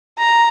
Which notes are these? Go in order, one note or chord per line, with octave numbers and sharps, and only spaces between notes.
A#5